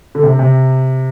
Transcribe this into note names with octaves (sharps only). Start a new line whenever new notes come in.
D3
C3
C3